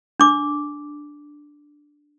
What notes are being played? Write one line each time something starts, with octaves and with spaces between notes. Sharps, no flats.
D4 D6